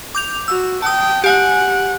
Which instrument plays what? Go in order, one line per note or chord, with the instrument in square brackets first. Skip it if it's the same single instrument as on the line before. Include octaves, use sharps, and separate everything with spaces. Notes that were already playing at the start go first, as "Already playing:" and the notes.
[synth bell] D6 G6 F7
[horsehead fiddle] F#4 [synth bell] E6
[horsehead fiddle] G5 [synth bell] A5 D#6
[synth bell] G4 G#5 [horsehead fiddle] F#5